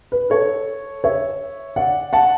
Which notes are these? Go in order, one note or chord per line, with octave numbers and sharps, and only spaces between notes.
B4
A4 C#5
C#5 E5
D5 F#5
F#5 A5